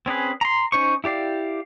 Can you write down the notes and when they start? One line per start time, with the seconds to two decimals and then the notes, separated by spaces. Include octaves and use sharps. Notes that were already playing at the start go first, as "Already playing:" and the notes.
0.06 C4 C#4 G#4 B4
0.41 A#5 C6
0.72 C#4 D#4 C5 C#6
1.04 E4 G4 D5 F5